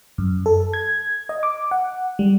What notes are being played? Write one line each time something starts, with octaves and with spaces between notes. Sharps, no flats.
F#2
A4
G#6
D#5
D6
F#5
G3